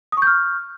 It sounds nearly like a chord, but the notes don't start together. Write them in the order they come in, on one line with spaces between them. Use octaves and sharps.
D#6 C#6 G6 F6